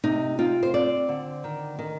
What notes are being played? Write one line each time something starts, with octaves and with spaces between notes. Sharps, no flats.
C3 D#4
C4 F4
C5
C4 D5
D3
D#3
D#3